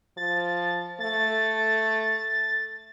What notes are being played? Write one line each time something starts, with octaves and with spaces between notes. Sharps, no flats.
F3 A6
A3 A6